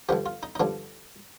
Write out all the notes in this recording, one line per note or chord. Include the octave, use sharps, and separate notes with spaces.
G2 D3 F3 G4
F4
D#4
D#4
G2 D3 F3 D4